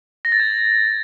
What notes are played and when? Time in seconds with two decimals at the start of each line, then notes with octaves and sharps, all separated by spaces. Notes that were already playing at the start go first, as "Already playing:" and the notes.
0.25 A#6
0.32 A6
0.40 G#6